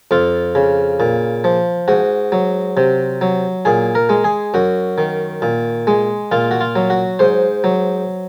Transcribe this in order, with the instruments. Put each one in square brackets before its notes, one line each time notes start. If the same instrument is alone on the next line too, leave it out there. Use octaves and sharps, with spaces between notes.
[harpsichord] F2 F4
C#3
A#2
F3
G#2 F#4
F#3
C3
F#3
A#2 G#4
A#4
G#3
G#4
F#2 F#4
D#3
A#2
G#3
A#2 F4
F#4
F4
F#3
F#4
G#2 C5
F#3